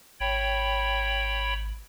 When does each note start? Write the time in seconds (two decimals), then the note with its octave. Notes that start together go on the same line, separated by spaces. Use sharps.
0.20 G#1 C#5 G5 B5